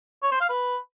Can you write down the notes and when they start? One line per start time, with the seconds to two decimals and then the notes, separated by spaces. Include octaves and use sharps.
0.23 C#5
0.32 C5
0.40 F5
0.49 B4